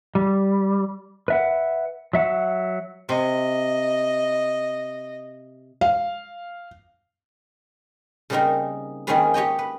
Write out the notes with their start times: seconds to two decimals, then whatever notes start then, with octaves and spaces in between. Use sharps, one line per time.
0.15 G3
1.28 B4 E5 F#5
2.13 F#3 E5 F#5
3.09 C3 D#5
5.81 F5
8.30 C#3 G3 A#3 C4 D#4 A#4
9.07 D#3 A#3 C4 C#4 G#4 B4
9.34 G4 C#5 D#5 G5
9.59 B4